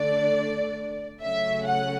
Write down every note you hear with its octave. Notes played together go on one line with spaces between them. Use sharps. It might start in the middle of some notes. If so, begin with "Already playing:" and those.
Already playing: D3 A3 D4 D5
C#3 F#3 A3 C#4 E5
F#5